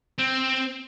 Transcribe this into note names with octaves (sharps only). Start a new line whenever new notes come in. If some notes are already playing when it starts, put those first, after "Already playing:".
C4